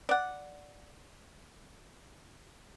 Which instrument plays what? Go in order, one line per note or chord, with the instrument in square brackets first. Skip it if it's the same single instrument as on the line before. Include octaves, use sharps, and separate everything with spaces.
[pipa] D5 F#5